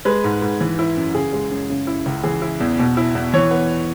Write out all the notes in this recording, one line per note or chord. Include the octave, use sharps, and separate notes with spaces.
G#3 B4
G#2
G#2
E3
E4
F#2
C#3 G#4
G#3
F#2
C#3
E4
C#2
E3 G#4
E4
E2
B2
E4
E2
E3 C#5
B3